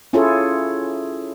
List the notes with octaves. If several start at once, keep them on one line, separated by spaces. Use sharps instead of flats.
C#4 E4 F4 G#4 A4 C#5